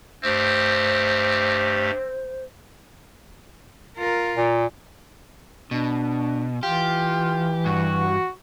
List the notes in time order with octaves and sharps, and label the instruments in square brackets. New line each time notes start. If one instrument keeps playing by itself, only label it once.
[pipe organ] G2 A3 G4 [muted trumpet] C4 [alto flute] C5
[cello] F4 A#4
[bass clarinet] A#2
[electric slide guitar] B2 [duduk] D4
[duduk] E3 [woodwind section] F4 [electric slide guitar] G4
[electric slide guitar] G2 [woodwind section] F#4